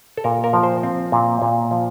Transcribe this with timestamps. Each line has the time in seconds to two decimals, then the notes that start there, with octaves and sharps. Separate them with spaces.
0.17 A4
0.24 A#2 A#4
0.44 A#4
0.53 F3
0.63 C5
0.83 C4
1.12 A#2
1.42 A#2
1.71 F3